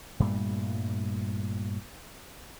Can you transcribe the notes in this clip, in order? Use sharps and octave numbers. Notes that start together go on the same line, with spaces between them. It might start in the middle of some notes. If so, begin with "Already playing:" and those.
G2 A#2 G3 A3